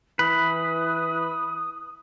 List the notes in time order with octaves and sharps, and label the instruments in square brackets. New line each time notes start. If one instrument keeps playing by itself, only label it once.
[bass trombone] E3 [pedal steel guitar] B4 [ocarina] D#6